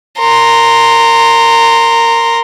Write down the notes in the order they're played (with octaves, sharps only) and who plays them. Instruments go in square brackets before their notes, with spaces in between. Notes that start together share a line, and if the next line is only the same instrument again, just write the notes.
[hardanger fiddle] A#4 C6